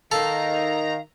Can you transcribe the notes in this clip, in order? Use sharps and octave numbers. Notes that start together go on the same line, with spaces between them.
D#3 A4 F5 A#5